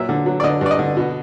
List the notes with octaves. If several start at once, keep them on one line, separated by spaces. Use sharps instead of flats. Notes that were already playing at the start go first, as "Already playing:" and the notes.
Already playing: A#2 F#3 E5
D3
F#3
D5
D3 D#5
G2 D5
D#5
D3
B2